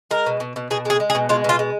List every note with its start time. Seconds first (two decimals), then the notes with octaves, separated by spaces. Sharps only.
0.11 G#3 A#4
0.26 B2
0.40 B2
0.56 B2
0.71 B2 G#4
0.85 G#3 G#4
1.00 G#3
1.10 G#4
1.15 B2
1.29 G#3 F4
1.44 B2 F4
1.59 G#3